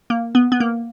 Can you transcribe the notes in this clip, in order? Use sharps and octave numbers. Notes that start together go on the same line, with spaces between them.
A#3
B3
B3
A#3